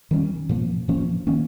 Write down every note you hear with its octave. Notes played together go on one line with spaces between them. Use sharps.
D#3 G3 A#3 C#4
A#2 F3 A#3
A#2 F3 A#3 C#4
D#3 A#3 C#4